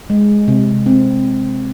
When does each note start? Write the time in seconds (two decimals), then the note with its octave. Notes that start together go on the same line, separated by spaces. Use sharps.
0.10 G#3
0.48 C3
0.86 C4